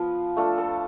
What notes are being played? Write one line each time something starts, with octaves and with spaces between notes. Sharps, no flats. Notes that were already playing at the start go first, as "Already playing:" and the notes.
Already playing: F3 B3 F4
A3 D4 F4 A4
A4